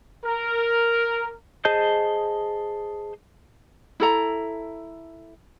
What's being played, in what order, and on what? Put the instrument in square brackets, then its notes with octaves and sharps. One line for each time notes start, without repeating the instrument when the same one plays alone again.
[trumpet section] A#4
[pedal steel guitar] G#4 C5 D#5 A5 G6
[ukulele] E4 A4 A#5